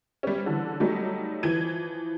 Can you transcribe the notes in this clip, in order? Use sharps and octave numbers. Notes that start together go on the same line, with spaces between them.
G3 C#4
D3 E3
F#3 G3 A3 D#4
E3 F3 G#6 D#7